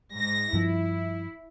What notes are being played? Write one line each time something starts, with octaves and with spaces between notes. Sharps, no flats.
G#2 A#6
G2 F3 E4